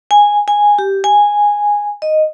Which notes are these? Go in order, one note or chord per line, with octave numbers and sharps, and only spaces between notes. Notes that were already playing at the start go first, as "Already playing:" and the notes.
G#5
G#5
G4
G#5
D#5